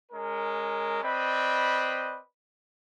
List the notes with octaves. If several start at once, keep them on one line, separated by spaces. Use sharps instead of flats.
G#3 C#4 A#4
C4 B4 D5 D#5 B5